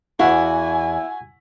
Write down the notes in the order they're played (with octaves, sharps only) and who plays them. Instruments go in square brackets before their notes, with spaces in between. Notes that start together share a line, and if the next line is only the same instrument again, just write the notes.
[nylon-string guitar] E2 F5 [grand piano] E4 [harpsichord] F#4 [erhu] G#5